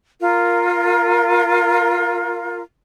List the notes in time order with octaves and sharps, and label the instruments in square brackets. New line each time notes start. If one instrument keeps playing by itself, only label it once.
[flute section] F4 A#4